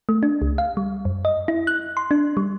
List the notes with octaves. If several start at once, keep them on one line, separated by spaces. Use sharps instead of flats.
A3
D4
C#2
F5
G3
F#2
D#5
E4
F#6
C6
D4
G3